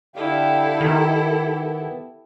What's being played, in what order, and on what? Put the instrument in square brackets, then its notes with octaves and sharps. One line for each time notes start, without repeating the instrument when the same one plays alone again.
[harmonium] D3 F5 G5 [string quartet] E4 G4 A4
[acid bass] D#3 [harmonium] B3